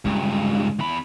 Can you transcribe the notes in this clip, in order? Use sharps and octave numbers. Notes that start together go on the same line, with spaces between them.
C#2 G2 G#3
E2 B5